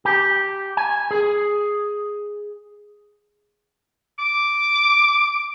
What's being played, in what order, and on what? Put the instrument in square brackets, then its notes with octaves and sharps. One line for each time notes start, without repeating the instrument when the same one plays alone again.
[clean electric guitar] G4
G#5
G#4
[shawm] D6